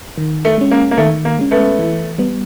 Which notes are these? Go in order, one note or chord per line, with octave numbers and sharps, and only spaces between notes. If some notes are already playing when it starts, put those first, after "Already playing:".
D#3
A3
G#3 C#4
A#3
A#3
D#3 A3
A#3
G#3 C#4
A3 B3
E3
G3 B3